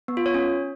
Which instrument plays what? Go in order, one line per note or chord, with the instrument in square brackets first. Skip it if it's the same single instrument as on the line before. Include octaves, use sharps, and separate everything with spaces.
[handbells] B3
F4
C#5
C#4